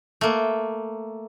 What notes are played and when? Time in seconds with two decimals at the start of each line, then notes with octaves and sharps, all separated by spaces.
0.21 A3 A#3